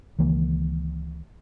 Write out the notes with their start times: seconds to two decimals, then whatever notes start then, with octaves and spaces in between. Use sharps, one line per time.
0.19 C#2 D#3 E3 A#3